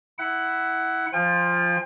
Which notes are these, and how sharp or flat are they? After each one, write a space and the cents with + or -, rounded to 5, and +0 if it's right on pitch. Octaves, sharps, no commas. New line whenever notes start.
E4 -5 F#5 +15
F3 +0 F4 +0 G5 +40